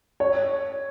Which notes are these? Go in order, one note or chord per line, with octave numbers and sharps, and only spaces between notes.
C#5